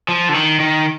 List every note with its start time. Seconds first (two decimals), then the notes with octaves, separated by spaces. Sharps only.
0.08 F3
0.29 D3
0.34 D#3
0.60 D#3